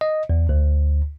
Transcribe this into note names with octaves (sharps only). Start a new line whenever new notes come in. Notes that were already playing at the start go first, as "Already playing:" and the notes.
D#5
E2
D2